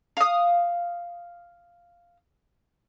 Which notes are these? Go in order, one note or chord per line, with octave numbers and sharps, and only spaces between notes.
F5 D#6